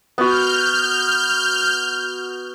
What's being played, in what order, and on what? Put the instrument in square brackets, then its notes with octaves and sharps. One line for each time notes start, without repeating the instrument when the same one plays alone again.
[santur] B3 F#4 [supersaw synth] F6 G6